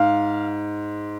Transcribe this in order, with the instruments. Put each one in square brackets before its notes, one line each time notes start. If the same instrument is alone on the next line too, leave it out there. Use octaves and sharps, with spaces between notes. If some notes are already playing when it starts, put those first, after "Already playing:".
Already playing: [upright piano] G#2 F5